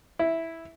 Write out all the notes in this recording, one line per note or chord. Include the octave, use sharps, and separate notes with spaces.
E4